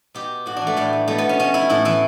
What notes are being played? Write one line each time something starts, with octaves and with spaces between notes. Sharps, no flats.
B2 G4
A2 F#4
D4
E3
A3
A2 G3
E3
B2 A3
B3
C#4
B2 C#4
E4
A2 E4
E3 E4